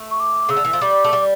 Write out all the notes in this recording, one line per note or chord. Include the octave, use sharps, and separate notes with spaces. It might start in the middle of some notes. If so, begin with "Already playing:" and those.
Already playing: A3
C#6
D6
C#3 E6
D3
E3
F3
G3 D6
A3
G3